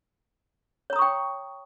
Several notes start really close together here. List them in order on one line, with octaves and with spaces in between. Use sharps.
C#5 A#5 D#6 C#6 G5